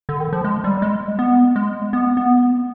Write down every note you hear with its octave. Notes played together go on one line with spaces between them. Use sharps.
D3
D#3
F3
G#3
G3
G#3
B3
G#3
B3
B3